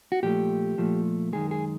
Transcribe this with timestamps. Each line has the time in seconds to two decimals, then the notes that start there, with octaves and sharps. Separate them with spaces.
0.12 F#4
0.23 A#2 F3 A3 G4
0.78 A#2 F3 A3
1.33 F#2 D#3 G#3 G#4
1.51 G#4